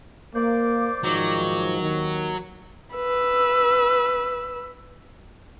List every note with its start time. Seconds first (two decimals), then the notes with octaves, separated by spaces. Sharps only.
0.35 A#3 C5 D5 D6
1.03 G#2 D#3 F3 F#3
1.81 D#2 D#3
2.95 B4 E6